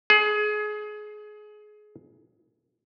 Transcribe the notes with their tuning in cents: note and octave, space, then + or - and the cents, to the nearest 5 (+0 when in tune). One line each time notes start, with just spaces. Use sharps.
G#4 +25